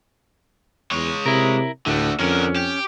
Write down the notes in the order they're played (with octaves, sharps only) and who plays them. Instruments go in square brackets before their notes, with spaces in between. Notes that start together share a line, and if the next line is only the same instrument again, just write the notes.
[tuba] E2 [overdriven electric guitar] G#3 C#5
[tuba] C3 [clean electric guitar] E4 A#4
[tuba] D2 [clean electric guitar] A2 [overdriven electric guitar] D3 A3
[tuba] F2 [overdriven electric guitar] D3 A#4 [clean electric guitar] C#4
[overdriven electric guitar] G4